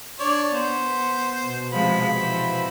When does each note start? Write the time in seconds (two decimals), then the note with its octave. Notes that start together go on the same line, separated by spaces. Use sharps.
0.20 D4 C#5 D5
0.55 B3 C5
1.43 B2
1.72 C3 F3 G#3 B5
2.19 E3 F3 C5